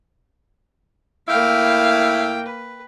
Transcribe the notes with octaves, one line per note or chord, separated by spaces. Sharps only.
A2 A#3 E4 F5 G5
B4